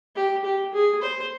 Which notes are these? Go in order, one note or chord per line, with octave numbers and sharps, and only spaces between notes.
G4
G4
G#4
C5